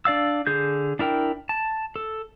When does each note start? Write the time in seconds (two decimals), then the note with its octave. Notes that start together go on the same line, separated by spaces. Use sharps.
0.05 D4 D5 F5 E6
0.47 D3 G#4 G6
0.99 D4 E4 A#4 G5
1.49 A5
1.96 A4